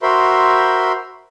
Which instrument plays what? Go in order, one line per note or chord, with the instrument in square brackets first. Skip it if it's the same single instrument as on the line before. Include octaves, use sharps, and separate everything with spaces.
[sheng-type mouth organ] F#4 A#4 C5 E5 B5 C6